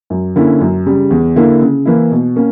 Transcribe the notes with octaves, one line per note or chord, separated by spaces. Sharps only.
F#2
D3 A#3 C#4 E4
F#2
C#3 G3
E2
D3 A#3 E4
C#3
E3 A#3 E4
B2
A#3 C#4